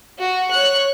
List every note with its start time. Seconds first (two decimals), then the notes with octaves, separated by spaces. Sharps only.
0.19 F#4
0.51 C#5 F#6